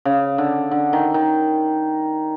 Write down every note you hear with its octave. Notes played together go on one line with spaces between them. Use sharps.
C#3
D3
D3
D#3
D#3